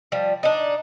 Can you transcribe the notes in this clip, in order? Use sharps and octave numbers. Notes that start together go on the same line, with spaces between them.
F3 G3
D4 D#4